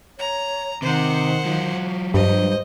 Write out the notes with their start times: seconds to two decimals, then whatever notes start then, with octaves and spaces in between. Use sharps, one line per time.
0.19 C#5 A#5
0.82 C3 D#3 C5 F#5
1.45 F#3 F4
2.14 G2 C5 D#5